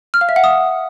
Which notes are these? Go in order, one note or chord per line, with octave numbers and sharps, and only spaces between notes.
F6
F5
E5
F#5
D#6